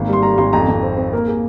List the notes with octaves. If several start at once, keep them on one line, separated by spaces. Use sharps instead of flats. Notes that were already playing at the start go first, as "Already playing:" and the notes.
Already playing: G#1 A#3
G3 C6
G3 A#5
G#1 C6
F2 A#5
F2
C4
C4
A#3 A#4
A#3 G#4